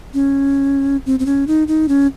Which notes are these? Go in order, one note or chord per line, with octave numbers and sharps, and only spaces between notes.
C#4
C4
C4
C#4
D#4
D#4
C#4